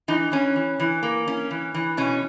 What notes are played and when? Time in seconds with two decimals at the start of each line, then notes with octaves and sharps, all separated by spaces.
0.08 E3 D#4
0.32 E3 C#4
0.56 E3
0.80 E3
1.03 A#3
1.27 C#4
1.51 E3
1.74 E3
1.97 B2 C#4